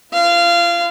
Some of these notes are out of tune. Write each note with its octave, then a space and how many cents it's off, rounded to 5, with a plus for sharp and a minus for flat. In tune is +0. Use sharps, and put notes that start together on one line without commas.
F4 -45 F5 -20